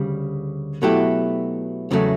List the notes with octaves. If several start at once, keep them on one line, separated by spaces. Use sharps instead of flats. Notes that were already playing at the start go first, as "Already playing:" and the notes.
Already playing: D2 C#3 G3
B2 F#3 A3 E4 G4
E2 C#3 F#3 A3